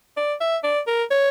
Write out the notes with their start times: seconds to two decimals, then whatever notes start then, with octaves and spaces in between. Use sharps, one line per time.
0.17 D5
0.41 E5
0.63 D5
0.87 A#4
1.11 C#5